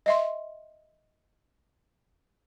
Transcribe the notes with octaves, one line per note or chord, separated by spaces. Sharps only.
D#5 E5 C6